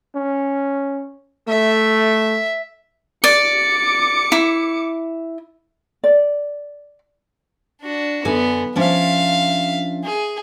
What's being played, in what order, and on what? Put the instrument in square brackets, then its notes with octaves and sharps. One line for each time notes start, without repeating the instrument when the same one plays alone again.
[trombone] C#4
[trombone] A3 [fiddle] E5
[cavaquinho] D5 [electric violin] D6 C#7
[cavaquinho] E4
[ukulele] D5
[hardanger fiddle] D4 F#4
[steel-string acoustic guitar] F#2 D3 G#5 [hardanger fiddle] B3
[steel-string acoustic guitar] F3 C#4 D4 [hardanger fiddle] E5 F5
[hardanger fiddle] G#4